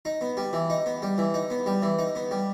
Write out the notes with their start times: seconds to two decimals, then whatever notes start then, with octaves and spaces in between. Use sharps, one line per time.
0.05 D#4
0.21 B3
0.37 G3
0.53 E3
0.70 D#4
0.86 B3
1.02 G3
1.18 E3
1.34 D#4
1.50 B3
1.66 G3
1.82 E3
1.99 D#4
2.15 B3
2.31 G3